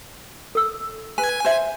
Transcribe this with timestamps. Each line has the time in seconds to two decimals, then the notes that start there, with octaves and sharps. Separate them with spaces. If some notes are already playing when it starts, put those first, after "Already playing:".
0.55 A4 E6
1.18 B4 G#5
1.45 C5 E5